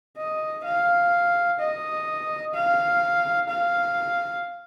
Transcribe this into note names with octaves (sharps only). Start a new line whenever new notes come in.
D#5
F5
D#5
F5
F5